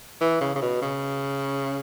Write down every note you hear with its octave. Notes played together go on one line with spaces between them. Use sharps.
E3
C#3
C#3
B2
C#3